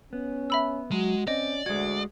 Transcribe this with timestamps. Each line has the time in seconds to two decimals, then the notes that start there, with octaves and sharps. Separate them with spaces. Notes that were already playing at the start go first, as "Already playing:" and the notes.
0.13 B3 C#4
0.50 E5 B5 E6
0.91 F#3 G#3 F#4
1.27 C4 C#4 D5 D#5
1.66 D2 G#3 F#4 G#6